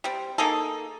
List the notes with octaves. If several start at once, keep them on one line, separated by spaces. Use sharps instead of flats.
G3 C4
A#3 D#4 G#4 A4